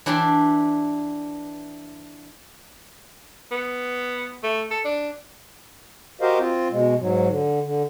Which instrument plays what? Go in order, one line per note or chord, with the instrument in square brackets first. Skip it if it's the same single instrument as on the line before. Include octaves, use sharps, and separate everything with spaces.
[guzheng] E3 D4 G4 D5 A5 C6
[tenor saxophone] B3
A3
A4
D4
[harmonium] F#4 G4 A#4 C5 D#5 F5
C4 F4
B2 G#3
G#2 F#3
D3
D3